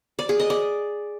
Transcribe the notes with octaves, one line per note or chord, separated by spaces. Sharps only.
D5
G#4
D#5
D5